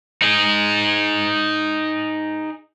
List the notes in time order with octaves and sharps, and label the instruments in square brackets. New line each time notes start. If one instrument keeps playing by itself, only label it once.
[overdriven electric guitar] D#4 G#4